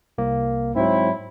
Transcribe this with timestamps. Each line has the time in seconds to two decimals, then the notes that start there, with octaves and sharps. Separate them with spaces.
0.18 C2 A#3
0.76 G#2 F#3 C4 E4